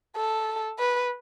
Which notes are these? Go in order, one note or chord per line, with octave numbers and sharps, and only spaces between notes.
A4
B4